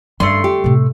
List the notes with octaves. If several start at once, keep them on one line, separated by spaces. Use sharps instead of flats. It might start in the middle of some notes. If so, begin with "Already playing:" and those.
G2 D#3 A3 C#4 C6
G4
A2 C3